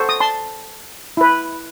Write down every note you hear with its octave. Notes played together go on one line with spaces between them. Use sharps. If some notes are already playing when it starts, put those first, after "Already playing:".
Already playing: F#4 A4 C5
D#6
A5 C6
E4 B4